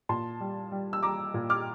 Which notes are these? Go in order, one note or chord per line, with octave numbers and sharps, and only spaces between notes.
A#2 A5 C6
G3
G3
E6
G3 A#5 D6
A#2
D6 F6